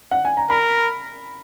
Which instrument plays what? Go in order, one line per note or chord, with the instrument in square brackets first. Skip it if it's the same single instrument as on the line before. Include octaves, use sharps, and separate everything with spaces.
[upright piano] F#5
G#5
A#5
[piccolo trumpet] A#4 [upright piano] B5